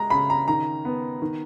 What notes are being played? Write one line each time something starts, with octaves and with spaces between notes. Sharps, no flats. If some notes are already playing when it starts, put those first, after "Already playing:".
Already playing: G#3 A#5
C#3 B5
A#5
D#3 A#5
B3
D#3